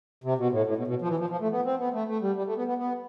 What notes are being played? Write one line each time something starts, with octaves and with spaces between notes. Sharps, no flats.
C3
B2
A2
A2
B2
B2
F3
E3
F3
F3
A3
B3
C4
B3
A3
A3
G3
G3
A3
B3
B3
B3